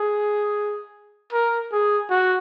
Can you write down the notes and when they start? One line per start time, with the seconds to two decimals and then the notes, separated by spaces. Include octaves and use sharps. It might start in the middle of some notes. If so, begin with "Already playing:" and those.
Already playing: G#4
1.33 A#4
1.72 G#4
2.10 F#4